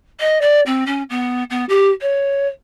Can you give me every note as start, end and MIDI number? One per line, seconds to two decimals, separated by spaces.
0.20 0.41 75
0.42 0.61 74
0.66 0.84 60
0.87 1.03 61
1.10 1.44 59
1.50 1.65 59
1.69 1.89 67
2.02 2.48 73